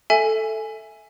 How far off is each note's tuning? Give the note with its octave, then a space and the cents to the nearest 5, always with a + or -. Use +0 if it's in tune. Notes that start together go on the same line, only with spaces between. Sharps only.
A4 +0 E5 +0 G#5 +0